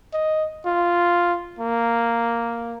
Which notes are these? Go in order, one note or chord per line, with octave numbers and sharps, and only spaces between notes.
D#5
F4
A#3